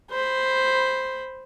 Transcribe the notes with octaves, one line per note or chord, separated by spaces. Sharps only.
C5 B5